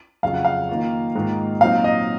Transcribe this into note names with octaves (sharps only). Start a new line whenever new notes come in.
F2 C#3 F#3 C#4 F4 F5
F#5
F5
D#3 A#3 F4
G#2 D#3 A#3 F4
A#2 F#3 C4 D#4 F5
D#5